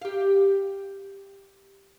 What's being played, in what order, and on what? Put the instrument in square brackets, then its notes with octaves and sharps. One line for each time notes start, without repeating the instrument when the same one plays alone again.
[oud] G4 F5